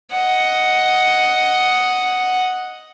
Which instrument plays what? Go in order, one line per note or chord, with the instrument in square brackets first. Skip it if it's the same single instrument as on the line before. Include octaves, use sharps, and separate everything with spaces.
[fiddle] D#5 F#5